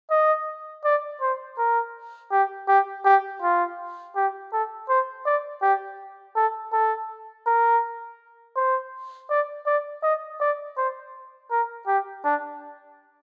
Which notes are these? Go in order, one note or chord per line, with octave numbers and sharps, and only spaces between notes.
D#5
D5
C5
A#4
G4
G4
G4
F4
G4
A4
C5
D5
G4
A4
A4
A#4
C5
D5
D5
D#5
D5
C5
A#4
G4
D4